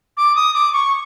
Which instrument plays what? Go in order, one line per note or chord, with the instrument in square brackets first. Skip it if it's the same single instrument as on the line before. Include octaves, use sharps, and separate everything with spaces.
[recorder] D6
D#6
D6
C#6